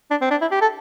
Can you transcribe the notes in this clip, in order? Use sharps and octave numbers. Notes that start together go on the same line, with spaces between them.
D4
C4
D4
E4
G4
A4